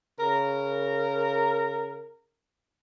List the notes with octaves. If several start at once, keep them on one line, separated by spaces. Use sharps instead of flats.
C#3 A#4